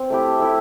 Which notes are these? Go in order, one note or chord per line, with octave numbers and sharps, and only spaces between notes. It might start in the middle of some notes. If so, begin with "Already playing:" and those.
Already playing: C4
A3 E4 G4
A3 E4 G4